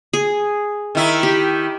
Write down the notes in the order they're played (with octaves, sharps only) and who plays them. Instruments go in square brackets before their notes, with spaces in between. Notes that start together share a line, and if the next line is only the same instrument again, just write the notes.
[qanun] G#4
[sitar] D#3 E4
[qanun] G4